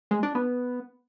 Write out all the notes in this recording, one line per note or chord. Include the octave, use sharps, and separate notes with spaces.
G#3
D4
B3